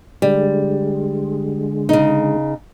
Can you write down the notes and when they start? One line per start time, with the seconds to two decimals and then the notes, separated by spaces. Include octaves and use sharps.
0.22 D3 G3 G#3
1.89 C#3 D#4